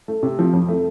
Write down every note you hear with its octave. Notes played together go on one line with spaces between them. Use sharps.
A3
C3
F3
F2
A3